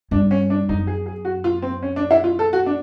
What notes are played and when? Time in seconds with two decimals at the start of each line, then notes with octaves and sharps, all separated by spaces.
0.11 G2 D4
0.31 C#4
0.50 D4
0.69 F#2 D#4
0.87 G#4
1.06 G#4
1.25 F#4
1.44 F4
1.62 C4
1.83 C#4
1.96 D4
2.11 E4
2.24 F4
2.39 A4
2.53 F#4
2.66 D4